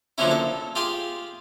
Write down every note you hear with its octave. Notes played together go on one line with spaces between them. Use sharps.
D3 F3 F#3 A#3 C#4 E4
A4
F4 G4 G#4 G5 C6